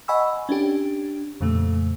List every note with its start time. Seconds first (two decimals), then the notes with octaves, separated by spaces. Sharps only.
0.08 D#5 F#5 G#5 B5 C#6 E6
0.49 C#4 D4 G4
1.41 F2 A#2 C#3 A3